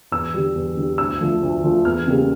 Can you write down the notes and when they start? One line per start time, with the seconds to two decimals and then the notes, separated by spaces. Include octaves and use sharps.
0.12 E2 E6
0.34 D3 G3
0.55 E2
0.77 D3 G3
0.98 D2 E6
1.21 D3 F3 A3
1.42 D2
1.64 D3 F3 A3
1.85 E2 F6
2.07 C#3 G3 A#3